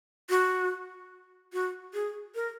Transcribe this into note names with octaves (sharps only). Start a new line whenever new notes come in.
F#4
F#4
G#4
A#4